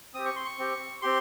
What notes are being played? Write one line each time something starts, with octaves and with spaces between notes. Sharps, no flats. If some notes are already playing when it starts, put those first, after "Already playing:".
C4 G4 D#6
C#6
C6
C#6
C4 G4
C4 G4 C6